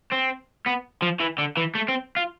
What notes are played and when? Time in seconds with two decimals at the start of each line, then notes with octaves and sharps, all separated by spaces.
0.12 C4
0.66 B3
1.02 F3
1.20 E3
1.38 D3
1.57 E3
1.75 A3
1.88 C4
2.17 F4